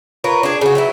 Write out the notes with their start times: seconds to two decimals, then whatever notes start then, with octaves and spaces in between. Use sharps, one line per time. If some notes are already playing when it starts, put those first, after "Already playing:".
0.24 F4 A#4 B4 C#5
0.43 D4 G#4
0.61 C#3 F#4
0.75 F#3 B3 E4